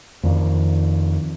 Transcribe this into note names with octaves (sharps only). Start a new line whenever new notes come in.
F2 D#3